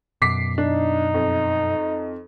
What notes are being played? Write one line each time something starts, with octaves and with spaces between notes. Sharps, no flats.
F#2 B2 D6 B6 C7
D4 D#4
F2